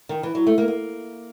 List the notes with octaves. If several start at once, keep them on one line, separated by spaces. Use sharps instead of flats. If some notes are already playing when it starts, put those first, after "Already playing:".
D#3
E3
F#3
A3
A#3
A#3